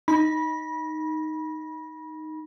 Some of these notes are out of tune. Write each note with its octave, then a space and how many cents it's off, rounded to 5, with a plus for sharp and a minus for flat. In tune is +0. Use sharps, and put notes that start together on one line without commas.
D#4 +0 B5 -25